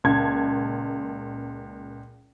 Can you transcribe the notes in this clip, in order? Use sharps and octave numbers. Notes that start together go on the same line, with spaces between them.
C#2 A#2 A5 G#6